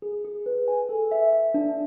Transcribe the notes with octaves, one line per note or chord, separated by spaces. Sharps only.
G#4
G#4
B4
G#5
A4
E5
E5
D4